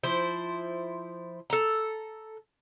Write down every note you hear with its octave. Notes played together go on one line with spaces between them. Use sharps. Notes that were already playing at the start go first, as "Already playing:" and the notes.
F3 E4 C5
A4 A#5